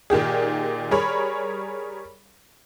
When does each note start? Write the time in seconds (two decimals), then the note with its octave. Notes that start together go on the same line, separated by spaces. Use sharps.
0.10 A#2 D#3 G4 G#4
0.91 G3 G#4 A#4 C#5 B5